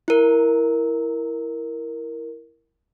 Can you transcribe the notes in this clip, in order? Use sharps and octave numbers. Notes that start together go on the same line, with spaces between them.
E4 A#4